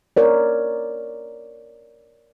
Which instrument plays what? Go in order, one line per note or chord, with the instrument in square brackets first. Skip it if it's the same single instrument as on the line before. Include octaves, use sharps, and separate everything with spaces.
[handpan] A#4 C#5 D5